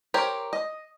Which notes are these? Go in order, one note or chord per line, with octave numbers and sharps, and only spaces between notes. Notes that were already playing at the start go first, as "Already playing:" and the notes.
G4 A#4 C5 C#5
D#5